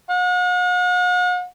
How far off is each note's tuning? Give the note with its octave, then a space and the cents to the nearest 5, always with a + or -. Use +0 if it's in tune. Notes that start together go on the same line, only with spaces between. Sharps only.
F#5 -45